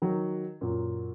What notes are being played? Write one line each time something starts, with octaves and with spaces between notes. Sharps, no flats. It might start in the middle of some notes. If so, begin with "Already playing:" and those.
D#3 F#3
F#2 A#2